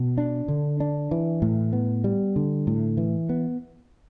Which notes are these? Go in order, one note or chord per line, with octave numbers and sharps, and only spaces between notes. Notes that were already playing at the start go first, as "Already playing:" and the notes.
Already playing: B2
D4
D3
D4
E3
A2
B3
G3
D3
A2
E3
B3